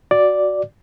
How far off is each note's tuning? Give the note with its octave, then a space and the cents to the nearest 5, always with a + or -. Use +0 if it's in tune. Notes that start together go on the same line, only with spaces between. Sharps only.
F#4 +0 D5 +0